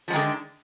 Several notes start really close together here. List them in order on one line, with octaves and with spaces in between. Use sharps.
F3 G#3 D#3 D3